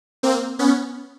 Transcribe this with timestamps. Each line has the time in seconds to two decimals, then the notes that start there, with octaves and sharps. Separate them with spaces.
0.23 A#3 C4
0.59 B3 C#4